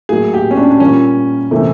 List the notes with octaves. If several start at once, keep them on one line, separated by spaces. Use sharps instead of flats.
A2 F#3 A#3 G#4
G4
C#4
D4
D4
A#2 G3 A#3 C#4
C3 E3 A3